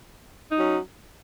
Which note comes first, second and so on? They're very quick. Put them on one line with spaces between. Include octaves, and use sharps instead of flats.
D#4 F#3 C#4